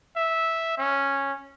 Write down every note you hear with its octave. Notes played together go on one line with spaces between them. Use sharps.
E5
C#4